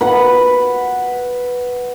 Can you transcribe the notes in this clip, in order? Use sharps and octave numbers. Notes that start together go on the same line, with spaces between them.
B4 F#5